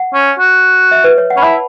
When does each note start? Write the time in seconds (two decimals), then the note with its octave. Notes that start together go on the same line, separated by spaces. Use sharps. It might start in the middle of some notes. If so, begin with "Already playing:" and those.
Already playing: F#5
0.14 C#4
0.39 F#4
0.91 E5
1.04 B4
1.18 C#5
1.30 F#5
1.37 C#4 B5
1.43 E4 A5